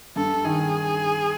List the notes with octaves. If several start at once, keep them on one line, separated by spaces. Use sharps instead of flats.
G2 A4
D#3 G#4